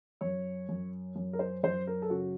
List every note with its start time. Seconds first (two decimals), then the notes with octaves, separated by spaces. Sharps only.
0.21 F#2 C#5
0.69 F#2
1.16 F#2
1.33 A#4
1.39 C5
1.63 F#2 C5
1.87 A#4
2.02 A4
2.10 C#3 F#4